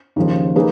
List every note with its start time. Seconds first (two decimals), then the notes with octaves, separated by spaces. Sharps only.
0.16 D#2 C#3 F3
0.56 F3 A#3 D#4 G#4 B4